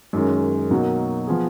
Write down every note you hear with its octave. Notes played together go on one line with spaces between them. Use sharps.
F#2 D#3 G#3 C#4
B2 F#3 A#3 D#4 F#4
F3 B3 F4 G#4